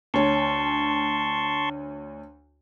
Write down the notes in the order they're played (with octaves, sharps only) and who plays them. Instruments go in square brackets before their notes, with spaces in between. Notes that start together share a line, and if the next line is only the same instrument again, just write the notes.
[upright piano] D2 C#5 [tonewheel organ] A5 C6 C#6